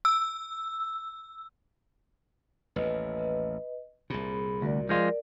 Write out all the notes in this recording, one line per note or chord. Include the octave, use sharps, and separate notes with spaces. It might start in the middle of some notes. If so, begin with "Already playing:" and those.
E6
A1 D#2 B4 D#5
C2 A#2 G#4 B5
D2 F#4 A#4 D5
F3 G#3 F4 A#4 D5